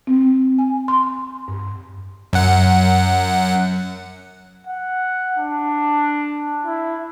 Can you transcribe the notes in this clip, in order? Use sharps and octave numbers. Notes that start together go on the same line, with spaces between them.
C4
G#5
C6
G2
F#2 F#5
F#5
D4
E4